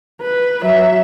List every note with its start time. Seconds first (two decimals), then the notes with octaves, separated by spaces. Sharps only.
0.21 B4
0.62 F#3 E5